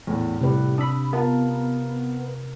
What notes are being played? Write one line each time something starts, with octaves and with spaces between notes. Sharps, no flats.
E2 A2
A2 C3 G3 B4
D4 B5 D#6 E6
B3 F4 A#4 F5 A5